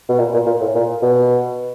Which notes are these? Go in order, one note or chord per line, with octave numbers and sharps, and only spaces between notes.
B2
A#2
A#2
A#2
A2
A#2
B2